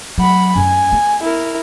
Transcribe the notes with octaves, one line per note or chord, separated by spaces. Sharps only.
F#3 F#5 B5
F#2 G#5
B3
E4 A#4